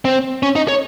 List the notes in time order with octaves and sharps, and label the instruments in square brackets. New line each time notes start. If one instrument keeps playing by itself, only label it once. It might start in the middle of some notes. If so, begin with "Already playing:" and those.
[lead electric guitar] C4
C#4
D#4
C#5